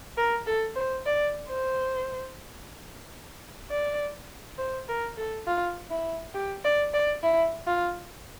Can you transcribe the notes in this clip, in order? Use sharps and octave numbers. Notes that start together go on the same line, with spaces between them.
A#4
A4
C5
D5
C5
D5
C5
A#4
A4
F4
E4
G4
D5
D5
E4
F4